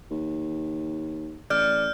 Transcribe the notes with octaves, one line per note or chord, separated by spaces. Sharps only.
D#2
A1 D5 F6 G6